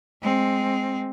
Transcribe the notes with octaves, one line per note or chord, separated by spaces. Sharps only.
G#3 C4